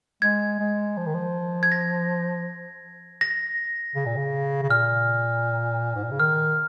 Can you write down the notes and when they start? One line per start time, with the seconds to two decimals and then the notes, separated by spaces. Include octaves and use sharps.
0.22 G#3 G#6
0.60 G#3
0.97 F3
1.06 D#3
1.14 F3
1.63 G#6
1.72 A#6
3.21 A#6
3.96 C#3
4.06 A#2
4.16 C#3
4.62 C#3
4.69 A#2 F6
5.96 G#2
6.04 A#2
6.11 C#3
6.20 D#3 F6